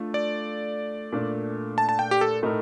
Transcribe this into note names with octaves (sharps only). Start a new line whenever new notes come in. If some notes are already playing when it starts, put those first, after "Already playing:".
Already playing: A3 D4 F4 A4
D5
A#2 A3 D4
A5
A5
G5
G4
A4
A2 A3 D#4 A#4